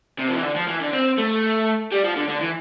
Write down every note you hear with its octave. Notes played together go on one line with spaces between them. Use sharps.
C3
F3
E3
D3
F3
E3
D3
C4
A3
G3
F3
D3
D3
E3